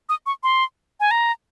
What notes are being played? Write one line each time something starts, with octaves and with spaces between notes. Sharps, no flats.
D#6
C#6
C6
G#5
A#5